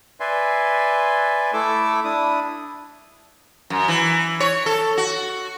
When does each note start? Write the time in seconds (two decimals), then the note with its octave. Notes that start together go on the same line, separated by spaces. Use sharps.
0.20 B4 D5 E5 G#5 C6
1.53 A3 E4 A4 D6 E6
2.04 D4 E4 D#6
3.70 F#2
3.88 E3
4.40 C#5
4.66 A4
4.97 F#4